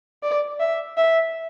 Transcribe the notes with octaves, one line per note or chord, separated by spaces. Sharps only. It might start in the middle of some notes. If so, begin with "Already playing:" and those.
D5
E5
E5